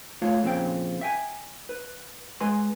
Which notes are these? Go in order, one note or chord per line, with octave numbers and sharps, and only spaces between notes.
A3 F4 C#5 F5
F2 A#2 C#3 C4 G5
E5 G5 G#5
B4
G#3 B4 G#5 C6